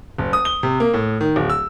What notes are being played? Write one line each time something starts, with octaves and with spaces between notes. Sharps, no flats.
F#1
D#6
G7
C3
A#3
A2
D#3
D1
E6